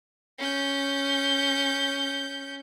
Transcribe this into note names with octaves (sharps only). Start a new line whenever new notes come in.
C#4 G6